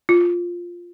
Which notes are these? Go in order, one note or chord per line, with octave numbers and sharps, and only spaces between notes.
F4